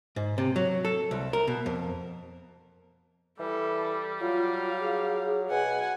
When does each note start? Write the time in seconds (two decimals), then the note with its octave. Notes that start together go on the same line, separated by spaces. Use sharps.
0.16 G#2
0.38 C3
0.56 F#3
0.85 A4
1.11 C2
1.33 A#4
1.47 B2
1.66 F2
3.39 E3 G3 A4
4.21 F#3 F4 F5
4.81 G#4
5.50 B2 F#5 G#5